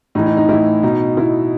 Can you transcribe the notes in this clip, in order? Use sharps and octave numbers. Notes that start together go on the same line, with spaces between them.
A2 E3 D#4
D#4
D#4
A2 E3 E4
B2 D#4
B2 E4